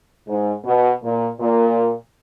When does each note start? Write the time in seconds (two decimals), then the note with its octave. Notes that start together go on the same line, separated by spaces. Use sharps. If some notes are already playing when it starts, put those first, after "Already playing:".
0.28 G#2
0.65 B2
1.03 A#2
1.40 A#2